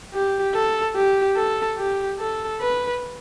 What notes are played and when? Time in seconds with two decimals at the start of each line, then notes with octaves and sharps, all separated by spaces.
0.14 G4
0.54 A4
0.96 G4
1.36 A4
1.78 G4
2.20 A4
2.61 B4